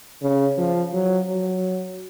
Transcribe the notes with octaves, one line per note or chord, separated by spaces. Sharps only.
C#3
F3
F#3
F#3